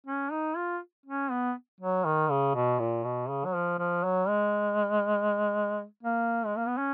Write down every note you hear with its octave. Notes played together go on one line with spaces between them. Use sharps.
C#4
D#4
F4
C#4
B3
F#3
D#3
C#3
B2
A#2
B2
C#3
F#3
F3
F3
F#3
G#3
A#3
G#3
A#3
B3
C#4